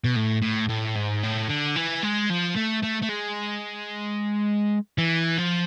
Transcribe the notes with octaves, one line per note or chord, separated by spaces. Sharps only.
B2
A2
A2
A2
G#2
A2
D3
E3
G#3
F3
A3
A3
A3
G#3
E3
F3